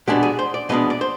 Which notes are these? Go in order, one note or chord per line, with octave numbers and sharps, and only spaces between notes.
B2 G#3 B3 D4 G4
G#4
C5
D5
B2 G#3 B3 D4 D#5
D5
C5